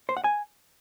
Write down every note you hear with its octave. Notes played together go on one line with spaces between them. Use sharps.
C5
F#5
G#5